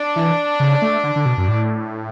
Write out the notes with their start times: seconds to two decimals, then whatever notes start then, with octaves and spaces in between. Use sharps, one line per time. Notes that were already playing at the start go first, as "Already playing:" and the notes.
Already playing: D4
0.16 E3
0.60 C#3
0.82 A3
1.04 D3
1.16 D3
1.26 B2
1.38 F#2
1.48 A2